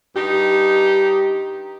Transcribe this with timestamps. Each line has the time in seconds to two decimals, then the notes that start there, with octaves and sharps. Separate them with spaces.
0.15 G2 D#4 G4